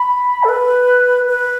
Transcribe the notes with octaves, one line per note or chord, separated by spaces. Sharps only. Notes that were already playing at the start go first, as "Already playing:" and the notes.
Already playing: B5
A4
B4
B4